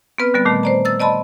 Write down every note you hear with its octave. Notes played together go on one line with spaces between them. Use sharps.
B3 C4 B4 F6
D3 G3 B3 A6
A#2 D#3 A3
C5 D5 A#5
E6 A6
D5 D#5 A5 B5 C6